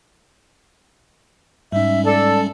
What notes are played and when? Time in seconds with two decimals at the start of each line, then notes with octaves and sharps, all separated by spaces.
1.72 G#2 G3 G#3 C#4 D#4 E5
2.05 A4 D5